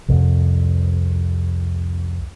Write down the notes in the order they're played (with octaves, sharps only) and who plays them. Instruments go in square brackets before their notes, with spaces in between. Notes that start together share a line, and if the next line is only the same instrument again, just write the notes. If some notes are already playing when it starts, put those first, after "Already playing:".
[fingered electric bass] C2 F2